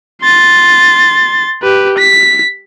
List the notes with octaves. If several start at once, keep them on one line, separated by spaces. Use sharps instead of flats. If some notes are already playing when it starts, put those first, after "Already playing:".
C6 A6
G4 B4
B6